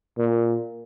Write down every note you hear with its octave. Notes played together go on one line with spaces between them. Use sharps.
A#2